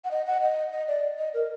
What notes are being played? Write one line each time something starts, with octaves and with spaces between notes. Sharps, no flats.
F#5
D#5
F#5
D#5
D#5
D5
D#5
A#4